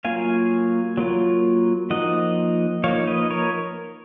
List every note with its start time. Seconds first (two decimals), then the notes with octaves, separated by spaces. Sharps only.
0.05 F#3 A#3 F4 F5 G#5
0.97 F#3 A#3 F4
1.90 F3 A#3 D#4 D#5 F#5
2.84 F3 A#3 D#4 C#5 F5
3.07 B4 D#5
3.30 A#4 C#5